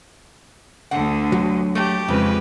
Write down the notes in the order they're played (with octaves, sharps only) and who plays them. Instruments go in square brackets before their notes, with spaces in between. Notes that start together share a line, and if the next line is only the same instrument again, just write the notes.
[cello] D2 D3 [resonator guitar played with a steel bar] F#5
[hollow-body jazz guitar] F#3
[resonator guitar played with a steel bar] A3 [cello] G4
[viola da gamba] F2 G#3 B4 [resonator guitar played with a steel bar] C#3